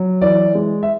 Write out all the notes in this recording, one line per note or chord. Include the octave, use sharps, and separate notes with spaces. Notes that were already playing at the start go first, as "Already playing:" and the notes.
Already playing: F#3
E3 D5
G#3
E5